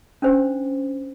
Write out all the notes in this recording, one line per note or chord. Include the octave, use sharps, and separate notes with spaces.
C#4 D4 C5